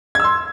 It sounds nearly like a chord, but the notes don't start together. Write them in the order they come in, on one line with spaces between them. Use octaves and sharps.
G#6 E6 C6